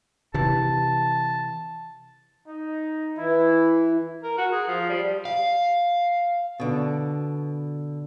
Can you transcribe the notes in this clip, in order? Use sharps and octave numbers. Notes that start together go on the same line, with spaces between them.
C3 E3 A5
D#4
E3 E4
A#4
F#4
G#4
F3
G3
F5
B2 D3